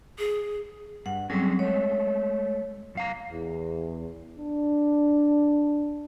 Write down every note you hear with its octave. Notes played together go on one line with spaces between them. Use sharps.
G#4
G2 F#5
F#3 G3 C4 C#4 G#4 A4
G#3 A3 C#5
F#2 F5 A#5
E2
D4